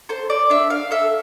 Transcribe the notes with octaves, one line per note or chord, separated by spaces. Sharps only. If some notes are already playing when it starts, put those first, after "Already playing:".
A4 C5
D5
D4 E5
F5
A4 E5